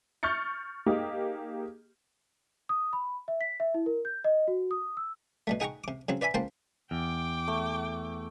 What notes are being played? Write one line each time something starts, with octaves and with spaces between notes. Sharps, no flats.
C#6 F6 G6 A6 C#7
A#3 D#4 G4 G#4
D#6
B5
E5
B6
E5
E4
A#4
G6
D#5
F#4
D#6
E6
B2 G3 A3
D#4 G#4 F#5 G5 A#5 C#6
C3 D6
C#3 F#3 C4
B4 D5 E5 G#5 B5
C#2 A#3 C5 G5 A5 C6
E2 G5 D6
A3